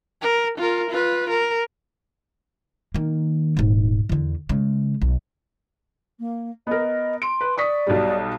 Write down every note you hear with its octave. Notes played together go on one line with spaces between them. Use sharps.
A#4
F4 A#4
F4 B4
A#4
D#3 A#3
D#1 G#2
E2 D3
C#3 G#3
B1
A#3
B3 A#4 D#5
C6 D7
B4
D5 C#6 D#6 B6
B1 B2 G3